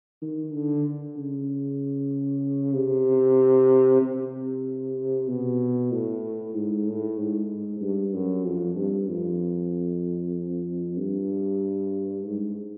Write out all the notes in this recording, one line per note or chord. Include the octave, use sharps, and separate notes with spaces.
D#3
D3
C#3
C3
C3
B2
A2
G#2
A2
G#2
G2
F#2
F2
G2
F2
G2
G#2